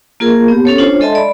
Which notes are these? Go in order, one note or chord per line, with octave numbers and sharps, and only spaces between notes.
A#3 F4 G#4 A#4
B3 G4
C#4 A4 C#5
D4 F4 C5 C#5
G#3 A4 D#5 E5 A5 C6
D5 B5